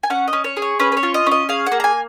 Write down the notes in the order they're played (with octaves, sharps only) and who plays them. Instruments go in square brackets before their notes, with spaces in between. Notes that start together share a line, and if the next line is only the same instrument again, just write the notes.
[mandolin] G#5
C#4 F#5
D#5
C#4
C#5
G#4
C#5
C#4 B4
B4
C#5
F4
D#5
C#4 D#5
G#4 F5
F#5
A#3
A#5
G#5